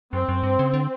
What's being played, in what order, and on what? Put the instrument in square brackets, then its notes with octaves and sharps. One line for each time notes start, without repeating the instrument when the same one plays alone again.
[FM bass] F#2 [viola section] C4
[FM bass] F#2
G2
C#3
D3